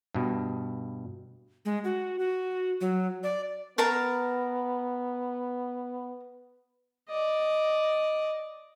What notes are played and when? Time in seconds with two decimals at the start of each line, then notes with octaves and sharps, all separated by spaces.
0.14 G2 B2
1.65 G#3
1.84 F#4
2.19 F#4
2.81 F#3
3.23 D5
3.78 B3 A#4 A5 A#5
7.09 D5 D#5